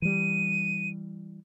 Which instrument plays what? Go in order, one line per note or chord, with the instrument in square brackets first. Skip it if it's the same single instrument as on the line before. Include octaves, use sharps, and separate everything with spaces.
[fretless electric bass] E3 G3 [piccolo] D#7